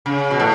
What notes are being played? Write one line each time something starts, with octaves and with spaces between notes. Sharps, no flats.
C#3
B2
A2